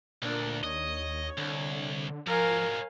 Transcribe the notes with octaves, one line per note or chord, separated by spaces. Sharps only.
D2 A#2 D4 A#4
D#2 C#5 D#5
C2 D3
G#2 F3 F#3 A#4 F5 G#5